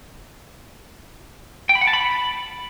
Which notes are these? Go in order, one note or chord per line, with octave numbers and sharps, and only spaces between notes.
G5
B5
F#5
A5
B5